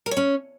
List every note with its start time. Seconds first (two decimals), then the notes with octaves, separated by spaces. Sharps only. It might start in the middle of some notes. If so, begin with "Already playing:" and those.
0.06 A#4
0.11 C#5
0.17 C#4